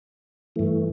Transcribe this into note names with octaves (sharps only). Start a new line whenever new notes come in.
G2 E3 A3